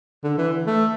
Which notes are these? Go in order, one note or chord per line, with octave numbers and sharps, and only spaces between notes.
D3
E3
A3